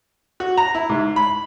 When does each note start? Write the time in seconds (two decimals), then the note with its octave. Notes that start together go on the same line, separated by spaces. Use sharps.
0.40 F#4
0.57 A#5
0.75 E4
0.89 G#2
1.16 B5